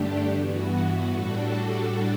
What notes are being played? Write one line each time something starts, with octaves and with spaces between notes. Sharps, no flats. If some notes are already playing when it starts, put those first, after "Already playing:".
Already playing: G2 D3 A3 D4 G4
G2 E3 B3 F#4
A2 G3 D4 F#4 A4